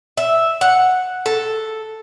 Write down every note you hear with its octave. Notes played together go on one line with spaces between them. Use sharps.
E5
F#5
A4